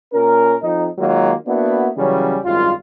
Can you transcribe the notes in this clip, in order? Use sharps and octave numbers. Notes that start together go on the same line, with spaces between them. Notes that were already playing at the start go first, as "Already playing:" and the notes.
A#2 C#4 A#4
F2 D#4
D#3 F#3 G#3 A#3 F4
A#3 B3 D4 E4 F#4
C#3 E3 F#3 G3 C#4
G#1 F#2 G3 F4